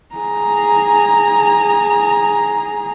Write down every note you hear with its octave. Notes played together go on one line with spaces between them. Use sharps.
G#4 A#5